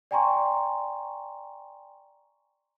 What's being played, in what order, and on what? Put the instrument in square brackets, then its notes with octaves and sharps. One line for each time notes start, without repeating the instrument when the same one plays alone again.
[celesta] D5 G5 G#5 A#5 C6 C#6